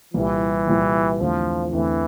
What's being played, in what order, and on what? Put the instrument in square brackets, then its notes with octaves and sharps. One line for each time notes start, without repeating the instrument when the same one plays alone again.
[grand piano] C2 A#2 G3 [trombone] E3
[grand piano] C2 A#2 G3
[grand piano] E2 D3 A3 C4 [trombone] F3
[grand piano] E2 D3 A3 C4 [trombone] E3